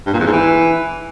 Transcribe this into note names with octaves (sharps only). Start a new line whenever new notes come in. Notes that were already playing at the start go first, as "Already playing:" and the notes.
G2
A#2
E2
G#2
E3